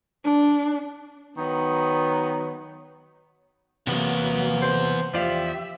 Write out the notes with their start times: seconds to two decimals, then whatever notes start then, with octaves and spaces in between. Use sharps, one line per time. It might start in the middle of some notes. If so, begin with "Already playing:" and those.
0.25 D4
1.36 D#3 F#3 B3
3.87 E2 C3 F#3 A#3 B3
4.62 C5
5.14 E2 F3 G4 D5 E5 F5